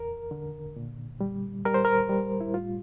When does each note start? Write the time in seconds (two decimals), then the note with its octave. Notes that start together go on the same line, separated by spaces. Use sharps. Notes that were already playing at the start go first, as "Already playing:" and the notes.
Already playing: E2 A#4
0.31 D3
0.76 A#2
1.21 G3
1.65 G3 A#4
1.74 C5
1.85 A#4
2.09 G3
2.41 E4
2.54 A2 F4